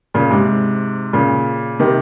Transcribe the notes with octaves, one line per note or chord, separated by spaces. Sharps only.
A#2 C#3
G#2 C3
A#2 C#3
C3 D#3